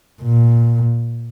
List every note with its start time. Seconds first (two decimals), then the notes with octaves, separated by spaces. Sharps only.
0.22 A#2